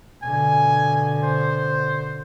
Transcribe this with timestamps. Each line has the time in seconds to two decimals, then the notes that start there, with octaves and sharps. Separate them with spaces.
0.23 B2 D3 G#5
1.23 C5